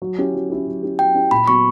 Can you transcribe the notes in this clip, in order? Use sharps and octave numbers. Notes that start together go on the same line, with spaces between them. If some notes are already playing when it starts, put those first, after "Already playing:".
F#3
C#4 E4 G4
F#3
C#4 E4 G4
F#3
C#4 E4 G4
F#3 G5
C#4 E4 G4
A#2 B5
F#3 B3 C#6